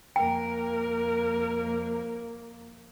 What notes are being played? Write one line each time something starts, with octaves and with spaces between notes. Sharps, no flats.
F2 A#3 A#4 G5